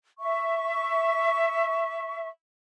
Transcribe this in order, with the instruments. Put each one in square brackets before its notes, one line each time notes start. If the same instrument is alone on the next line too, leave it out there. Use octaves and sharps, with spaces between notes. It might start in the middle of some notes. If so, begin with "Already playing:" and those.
[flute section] E5 C#6